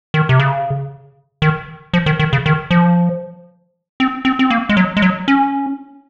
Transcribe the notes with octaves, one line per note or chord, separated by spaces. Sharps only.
D#3
C3
C#3
D#3
F3
D#3
D#3
C#3
D#3
F3
C4
C4
C4
A#3
G#3
F#3
G#3
F#3
C#4